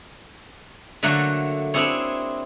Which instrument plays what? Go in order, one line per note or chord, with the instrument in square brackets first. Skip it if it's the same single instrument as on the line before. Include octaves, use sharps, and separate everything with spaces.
[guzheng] D3 F#3 A3 A#3 F#4
C4 D4 E4 G#4 C#5